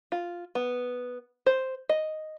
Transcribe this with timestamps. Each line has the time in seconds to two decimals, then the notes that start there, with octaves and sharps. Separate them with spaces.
0.12 F4
0.55 B3
1.46 C5
1.89 D#5